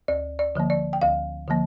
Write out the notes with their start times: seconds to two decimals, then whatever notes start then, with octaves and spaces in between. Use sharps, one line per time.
0.08 D2 D5
0.39 D5
0.55 D3 F3 A#3
0.70 D5
0.93 G5
1.02 D2 F5
1.48 D3 F3 A#3